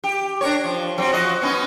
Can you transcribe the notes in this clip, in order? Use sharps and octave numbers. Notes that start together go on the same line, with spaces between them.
G4
D4 A#4 C#5
F3
F#3 C4
F3 F#4 D#5
B3 C#4 D#4